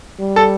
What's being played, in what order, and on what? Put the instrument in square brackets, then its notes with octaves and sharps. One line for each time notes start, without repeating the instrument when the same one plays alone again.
[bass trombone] G3
[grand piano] A4